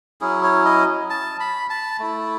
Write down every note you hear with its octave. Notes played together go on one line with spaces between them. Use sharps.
F#3 C#4 E4 G#4
C#5
D#5
A5
B5
A5
A3 E4